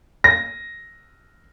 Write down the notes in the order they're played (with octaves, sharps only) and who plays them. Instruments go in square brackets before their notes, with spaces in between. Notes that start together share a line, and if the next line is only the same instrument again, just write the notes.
[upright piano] A#6